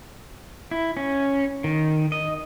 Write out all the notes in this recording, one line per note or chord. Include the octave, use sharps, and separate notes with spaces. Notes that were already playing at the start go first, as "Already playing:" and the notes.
E4
C#4
D#3
D#5